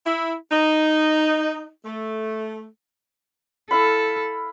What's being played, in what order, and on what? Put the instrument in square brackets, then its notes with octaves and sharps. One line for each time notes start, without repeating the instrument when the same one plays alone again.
[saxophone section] E4
D#4
A3
[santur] E4 F5 B5 [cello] A4